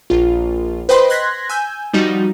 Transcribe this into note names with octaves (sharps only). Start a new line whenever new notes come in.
A#1 F4
B4 C5 D#5 G5 B5 C6
C6 F#6 G#6 A#6 B6
G#5 E6 G6
F3 G3 D#4 F#4